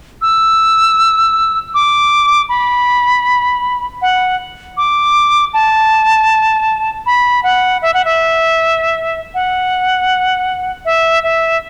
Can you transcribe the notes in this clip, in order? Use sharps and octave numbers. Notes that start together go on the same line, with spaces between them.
E6
D6
B5
F#5
D6
A5
B5
F#5
E5
F#5
E5
F#5
E5
E5